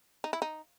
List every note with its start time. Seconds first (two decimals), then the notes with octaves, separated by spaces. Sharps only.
0.24 D#4
0.33 E4
0.42 D#4